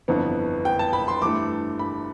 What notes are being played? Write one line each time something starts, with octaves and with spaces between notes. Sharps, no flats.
G1 F2 E3 B3
G5
A5
B5
C6
G2 E3 A3 D6
B5